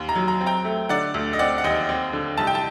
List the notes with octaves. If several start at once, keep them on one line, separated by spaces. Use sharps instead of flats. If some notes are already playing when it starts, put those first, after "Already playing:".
Already playing: D#2
A#5
F#3
A#5
C4
G5 A#5
A3
D3 D5 F#5
D2
D#5
C4 D5 F#5
F#5
D#2 D#5 G5
C4
D3
C2 A5
G5
A5